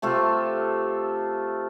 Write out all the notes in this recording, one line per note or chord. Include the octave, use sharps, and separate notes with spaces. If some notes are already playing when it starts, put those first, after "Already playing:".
C3 A3 F4 A4